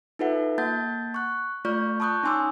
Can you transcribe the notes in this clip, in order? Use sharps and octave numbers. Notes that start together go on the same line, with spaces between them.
D#4 F4 A4 B4 E5 F#5
A#3 F#5 A5 G6 A6
C#6 F#6
A3 F4 D5 C#6 F6 G6
A5 B5 C#6 D#6 F#6 G6
C#4 D#4 G#5 C6 D6 E6